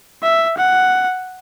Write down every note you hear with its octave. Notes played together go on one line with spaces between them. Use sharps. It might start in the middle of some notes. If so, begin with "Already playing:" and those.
E5
F#5